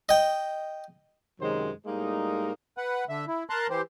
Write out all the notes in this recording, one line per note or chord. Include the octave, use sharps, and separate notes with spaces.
D#5 G5
F#2 C3 D#3 F#3 G#3 C5
A2 G3 G#3 A#3 D#4
B4 F#5
D3 E5
E4
A#4 A5 A#5 C6 F#6
E3 G4 C5